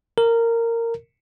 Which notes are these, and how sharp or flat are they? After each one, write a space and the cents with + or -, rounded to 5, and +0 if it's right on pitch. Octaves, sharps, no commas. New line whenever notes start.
A#4 -15